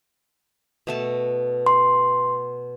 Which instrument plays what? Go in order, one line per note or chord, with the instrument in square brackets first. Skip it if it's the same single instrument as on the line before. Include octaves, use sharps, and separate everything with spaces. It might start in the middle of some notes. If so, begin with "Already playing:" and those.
[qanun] B2 A3 A5
[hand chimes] C6